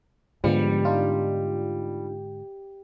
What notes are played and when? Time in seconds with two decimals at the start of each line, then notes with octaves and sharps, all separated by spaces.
0.44 G#2 D3 F3 G3 G#3 B3 C#7
0.85 D4 D#4 F4